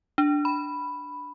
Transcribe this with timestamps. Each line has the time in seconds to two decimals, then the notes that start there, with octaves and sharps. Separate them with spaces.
0.18 D4
0.45 B5